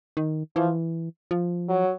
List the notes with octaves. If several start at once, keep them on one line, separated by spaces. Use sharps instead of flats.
D#3
E3 F3
F3
F#3